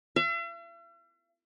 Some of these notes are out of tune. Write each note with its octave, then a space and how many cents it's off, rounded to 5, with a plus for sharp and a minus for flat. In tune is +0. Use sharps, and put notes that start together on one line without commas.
E5 +45